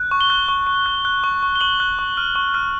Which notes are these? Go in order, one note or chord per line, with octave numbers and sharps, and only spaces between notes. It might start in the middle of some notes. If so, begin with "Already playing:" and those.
Already playing: F#6
C#6
G7
F#6
C#6
C#6
F#6
F#6
C#6
C#6
G7
C#6 F#7
F#6
C#6
F6
C#6
F6